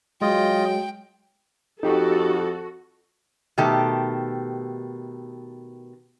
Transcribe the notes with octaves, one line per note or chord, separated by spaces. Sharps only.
F#3 G#3 F4 D#5 G5
F2 D#4 F#4 G4 A4
B2 D#3 A3 G4 A5